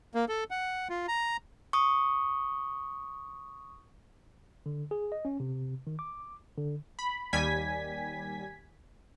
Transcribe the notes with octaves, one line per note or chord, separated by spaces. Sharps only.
A#3
A4
F#5
F4
A#5
C#6 D#6
D3
G#4
D#5
C#4
C3
D#3
D6
D3
B5
D#2 G3 G#5 G#6 B6